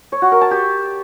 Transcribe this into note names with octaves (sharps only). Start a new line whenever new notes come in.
C#5
F#4
A#4
A5
G4